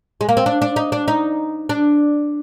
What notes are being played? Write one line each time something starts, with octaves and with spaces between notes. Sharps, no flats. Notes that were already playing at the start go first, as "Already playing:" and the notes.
G#3
A#3
C4
D4
D4
D#4
D4
D#4
D4